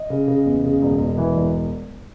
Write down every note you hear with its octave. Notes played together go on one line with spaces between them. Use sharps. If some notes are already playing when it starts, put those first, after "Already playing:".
Already playing: D#5
C#3
C#3
E2
C#3
E1
E1
E3
E1